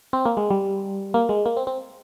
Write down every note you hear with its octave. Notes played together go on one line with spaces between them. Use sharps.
C4
A#3
G#3
G3
A#3
G#3
A#3
C4
C4